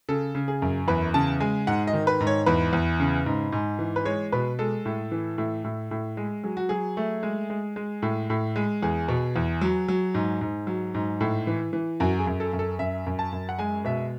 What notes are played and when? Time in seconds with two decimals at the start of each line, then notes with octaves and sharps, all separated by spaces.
0.09 C#3 A4
0.35 C#3
0.48 G#4
0.62 F#2
0.88 E2 B4
1.14 C#3 A5
1.40 G#3 G#5
1.67 G#2 F#5
1.87 D#5
1.93 D#3
2.07 B4
2.20 G#2
2.27 C#5
2.46 E2 B4
2.73 E2
3.00 C#3
3.26 G#2
3.52 G#2
3.79 E3
3.96 B4
4.05 G#3 C#5
4.32 B2 B4
4.59 G#3 A4
4.85 A2
5.12 E3
5.38 A2
5.64 A2
5.91 A2
6.17 G#3
6.44 F#3 G#4
6.57 F#4
6.69 F#3 G#4
6.97 A3
7.23 G#3
7.50 G#3
7.76 G#3
8.02 A2
8.30 A2
8.56 G#3
8.82 E2 G#4
9.08 B2
9.36 E2
9.61 F#3
9.88 F#3
10.14 G#2
10.41 G#2
10.67 F#3
10.94 G#2
11.20 A2
11.47 E3
11.73 E3
12.00 F#2 F#4
12.19 G#4
12.27 F#2
12.40 A4
12.53 F#2
12.59 A4
12.79 F#2 E5
13.06 F#2
13.19 A5
13.32 F#2
13.49 F#5
13.59 G#3 G#5
13.85 B2 E5